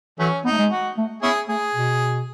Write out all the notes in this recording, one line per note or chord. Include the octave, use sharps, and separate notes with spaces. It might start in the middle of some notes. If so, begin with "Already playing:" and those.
E3 F#3 A3 C#4
B3 D#4
A3
G#3
F#4
A3
B3 C#4 E4 G#4
A3 G#4
B2